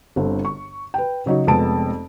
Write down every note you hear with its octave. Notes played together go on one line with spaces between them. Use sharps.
G1 D3 C4
C#6
B4 G5
C#3 F#3 D#4 C#5
F1 F2 G#3 B3 A5 D7